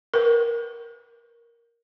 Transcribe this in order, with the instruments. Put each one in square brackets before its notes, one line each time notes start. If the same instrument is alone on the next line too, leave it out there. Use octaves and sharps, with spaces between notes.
[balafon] A#4 B4